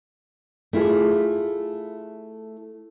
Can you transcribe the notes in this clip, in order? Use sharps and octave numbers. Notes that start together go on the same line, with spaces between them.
A3 E4 F4 G#4